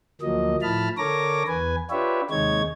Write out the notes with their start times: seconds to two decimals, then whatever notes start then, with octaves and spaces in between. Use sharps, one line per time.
0.22 D2 F3 F#3 A#3 D#5
0.62 A2 F3 E4 A5 B5 F6
0.98 D3 A4 A#4 C#5 D6 A#6
1.47 E2 B4 G#5
1.91 D4 F4 G4 B4 C#5 E5
2.30 D#2 C3 G#3 D#4 C#5 G#6